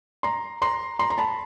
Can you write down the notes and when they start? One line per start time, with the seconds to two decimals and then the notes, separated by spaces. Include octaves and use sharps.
0.23 A#5 C6
0.62 A#5 C6
0.99 A#5 C6
1.10 A#5
1.18 A5 B5